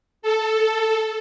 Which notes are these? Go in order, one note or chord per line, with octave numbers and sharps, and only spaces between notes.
A4